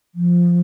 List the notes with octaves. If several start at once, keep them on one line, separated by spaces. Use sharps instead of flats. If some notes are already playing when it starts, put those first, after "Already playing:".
F3